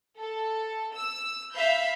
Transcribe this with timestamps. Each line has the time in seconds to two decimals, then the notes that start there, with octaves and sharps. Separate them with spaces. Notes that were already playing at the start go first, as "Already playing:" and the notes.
0.18 A4
0.95 E6
1.54 E5 F5 B5 G6